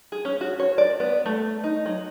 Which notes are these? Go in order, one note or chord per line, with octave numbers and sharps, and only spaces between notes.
G#4
C#4
F#4
C#5
D5
B3
A3
D#4
F#3